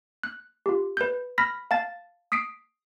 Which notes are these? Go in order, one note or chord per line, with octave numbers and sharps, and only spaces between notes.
F#6
F4 G4
B4 G6
B5 F6 A#6 B6
F5 A5 A6
D#6 B6 C7 D7